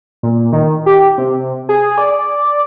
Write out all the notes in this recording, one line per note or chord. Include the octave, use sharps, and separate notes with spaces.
A#2
D#3
G4
C3
G#4
D5